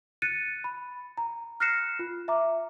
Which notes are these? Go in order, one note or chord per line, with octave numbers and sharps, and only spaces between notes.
F#6 A6 C#7 D#7
B5
A#5
F6 F#6 A#6 C7 C#7 E7
F4
E5 A#5 D6